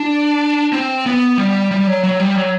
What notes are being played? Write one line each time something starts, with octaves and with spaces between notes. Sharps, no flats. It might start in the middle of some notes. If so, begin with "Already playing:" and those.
Already playing: D4
C4
B3
G3
G3
F#3
F#3
G3
F#3